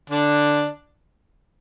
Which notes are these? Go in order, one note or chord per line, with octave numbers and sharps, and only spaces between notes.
D3 D4